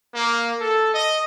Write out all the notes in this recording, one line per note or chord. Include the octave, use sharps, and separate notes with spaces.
A#3
A4
D#5